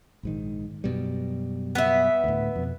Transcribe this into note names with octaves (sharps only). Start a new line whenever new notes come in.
A#1 G#2 D#3
F#2 B2 G3
B3 E5
D2 A2
F2 B2